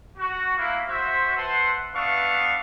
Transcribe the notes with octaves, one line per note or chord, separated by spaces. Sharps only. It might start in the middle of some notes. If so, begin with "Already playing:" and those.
F#4
A#3 E4
F#4 C5 E5
B4 C5 E5 F#5 A5 C6
B3 D4 B4 E5 F5 C#6